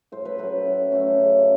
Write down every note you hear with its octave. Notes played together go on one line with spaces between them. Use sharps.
A2 C5
B4
F#3 A3 C#4 B4
A2
F#3 A3 C#4
C#3